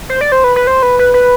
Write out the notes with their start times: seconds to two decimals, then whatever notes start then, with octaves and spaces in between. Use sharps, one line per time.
0.09 C5
0.21 D5
0.32 C5
0.44 B4
0.56 B4
0.67 C5
0.83 B4
0.99 B4
1.14 B4